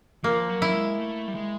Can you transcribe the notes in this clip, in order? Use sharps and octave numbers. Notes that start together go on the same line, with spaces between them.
F3 A#3
F#3
E4
G#3
A3
G3
G#3